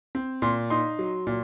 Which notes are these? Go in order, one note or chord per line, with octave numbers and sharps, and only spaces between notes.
C4
A#2 C6
D#4 C6
F#3
A#2